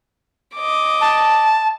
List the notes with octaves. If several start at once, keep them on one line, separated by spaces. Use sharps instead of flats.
D#5 D6
A5